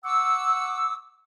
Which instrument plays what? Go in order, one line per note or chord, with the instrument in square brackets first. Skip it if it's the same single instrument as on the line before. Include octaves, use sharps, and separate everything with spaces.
[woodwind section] F#5 C#6 D6 E6